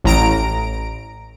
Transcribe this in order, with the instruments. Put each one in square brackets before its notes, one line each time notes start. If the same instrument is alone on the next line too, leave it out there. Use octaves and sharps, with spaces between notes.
[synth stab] A1 A#5 D7